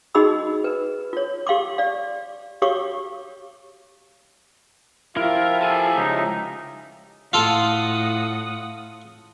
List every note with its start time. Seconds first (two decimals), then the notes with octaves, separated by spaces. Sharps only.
0.15 D#4 F#4 G#4 D#5 B5 E6
0.64 B4
1.13 F4 C#5
1.47 G4 F5 C6 D6
1.78 D5 F5
2.62 F#4 G4 C#5 F5 C#6 D6
5.17 F3 E4 F4 G4 A#4 E5 F5
5.62 A4 G#5
5.96 C#2 D#4
7.33 A2 F4 A4 F#5 D#6